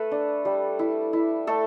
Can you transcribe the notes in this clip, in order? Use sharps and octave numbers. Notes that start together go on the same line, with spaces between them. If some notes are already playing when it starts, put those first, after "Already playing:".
Already playing: A3 A4 B4
D4
G3
E4
E4
A3 A4